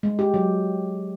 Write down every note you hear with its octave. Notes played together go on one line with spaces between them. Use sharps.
G#3
G4
F#3